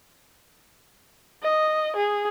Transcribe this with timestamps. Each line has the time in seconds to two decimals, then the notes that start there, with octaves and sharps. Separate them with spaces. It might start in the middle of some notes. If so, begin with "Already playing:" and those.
1.43 D#5
1.96 G#4